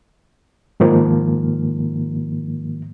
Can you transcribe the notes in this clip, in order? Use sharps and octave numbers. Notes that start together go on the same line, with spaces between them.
G#2 D#3 F3 A#3